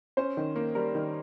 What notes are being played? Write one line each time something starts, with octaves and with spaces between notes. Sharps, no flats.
C#4 C5
D#3
A#3
G3 A#4
D#3